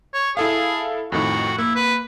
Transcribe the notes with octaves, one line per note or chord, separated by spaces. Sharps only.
C#5
E4 G#4 A4 F5
F2 A2 D#3 F#4
A#3 E4
B4